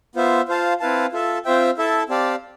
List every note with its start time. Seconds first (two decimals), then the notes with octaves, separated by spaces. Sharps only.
0.15 B3 F4 C5 E5
0.48 F4 C5 F5 A5
0.80 C4 E4 B4 F5 A5
1.12 F4 A4 E5 A5
1.45 C4 F4 C5 E5 G5
1.77 E4 A4 E5 A5
2.09 C4 G4 D5 F5 A5